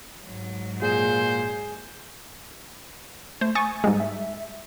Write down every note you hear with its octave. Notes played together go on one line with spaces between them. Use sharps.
G#2 F#3
A#2 G#4 C5
A3 C5
G#5 C#6 D#6 A6
G#2 G3 G#3
E5